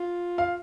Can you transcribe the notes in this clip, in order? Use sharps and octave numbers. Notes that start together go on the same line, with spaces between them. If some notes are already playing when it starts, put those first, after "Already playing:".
Already playing: F4
F5